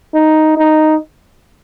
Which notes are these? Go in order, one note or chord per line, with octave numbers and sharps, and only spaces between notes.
D#4
D#4